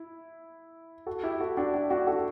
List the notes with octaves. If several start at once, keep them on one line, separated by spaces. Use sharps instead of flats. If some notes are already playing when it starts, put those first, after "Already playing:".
Already playing: E4
F#4 A4
E4 G4
F#4 A4
D4 F#4
D4 F#4
D4 F#4
F#4 A4